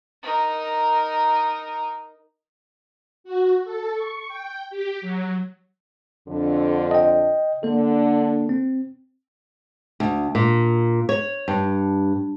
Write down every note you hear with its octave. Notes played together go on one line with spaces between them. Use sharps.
D#4 A#4
F#4
A4
C#6
G5
G4
F#3
F2 D3
D#5 G5
D3 A#3 A4
C4
D2
A#2
C#5
G2